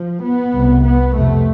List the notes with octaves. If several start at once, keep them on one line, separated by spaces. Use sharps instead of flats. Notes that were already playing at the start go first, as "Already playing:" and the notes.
Already playing: F3
B3
C2 C3
B3
F2 C3 A3